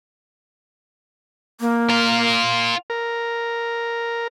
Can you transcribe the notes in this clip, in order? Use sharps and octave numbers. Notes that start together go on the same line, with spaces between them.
A#3
F4 A#4
A#4